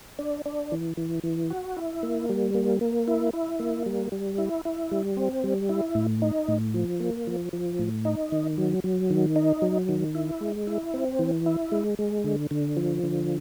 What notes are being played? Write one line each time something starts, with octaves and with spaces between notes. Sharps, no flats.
D4
D4
E3
E3
E3
F#4
E4
A#3
G3
A#3
A#3
E4
E4
A#3
G3
G3
E4
E4
G3
C4
G3
E4
A2
D#4
A2
F3
A#3
F3
F3
A2
D#4
D#3
F#3
F#3
D#3
D#4
F#3
D#3
E4
G#3
E4
C4
E3
E4
G#3
G#3
D3
D3
F3
D3